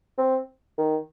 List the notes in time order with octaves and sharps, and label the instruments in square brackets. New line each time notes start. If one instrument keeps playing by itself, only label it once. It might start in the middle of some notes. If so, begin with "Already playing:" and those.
[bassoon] C4
D#3